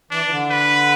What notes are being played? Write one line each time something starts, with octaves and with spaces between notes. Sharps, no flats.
E3 D4
E3
D3
B4